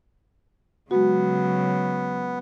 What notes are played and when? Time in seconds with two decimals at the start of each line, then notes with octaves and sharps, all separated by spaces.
0.91 C#3 F#3 G#3 B3 F#4